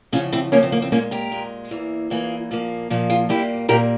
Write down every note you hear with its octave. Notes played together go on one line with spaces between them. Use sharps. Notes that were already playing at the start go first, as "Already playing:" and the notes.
E2 C#3 F3 C#4 F4
C4 E4
E2 C#3 F3 A#3 C#4
C4
A#3
C4
A#2 G#3 A#3 C#4
G4 A#4
A#2 G#3
E2 E3 A#3
E2 E3 A#3 F4 G#4
A#2 F3 A#3
A#2 F3 A#3
F4 G#4
A#2 G3 A#3 E4 G4
A#2 G3 A#3 G4 A#4